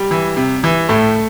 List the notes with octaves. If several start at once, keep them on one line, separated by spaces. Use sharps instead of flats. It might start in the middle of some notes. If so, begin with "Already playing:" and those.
Already playing: G3
E3
C3
E3
A2 A3